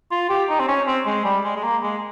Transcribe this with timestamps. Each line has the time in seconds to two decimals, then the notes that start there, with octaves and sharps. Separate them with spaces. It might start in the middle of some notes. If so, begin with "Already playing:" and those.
0.11 F4
0.29 G4
0.49 D#4
0.60 C4
0.68 C#4
0.87 C4
1.06 G#3
1.25 G3
1.44 G#3
1.56 G#3
1.63 A#3
1.83 G#3